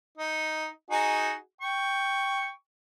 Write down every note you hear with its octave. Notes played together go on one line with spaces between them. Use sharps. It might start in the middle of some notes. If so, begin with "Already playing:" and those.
D#4
D#4 F#4 G#4
G5 C#6